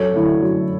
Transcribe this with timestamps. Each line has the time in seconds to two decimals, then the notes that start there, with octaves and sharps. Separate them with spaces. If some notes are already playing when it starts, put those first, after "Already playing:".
Already playing: F#2 A4 C#5
0.14 D3 A3 E4
0.41 F#2